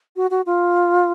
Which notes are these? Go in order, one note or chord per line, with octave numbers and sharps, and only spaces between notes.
F#4
F#4
F4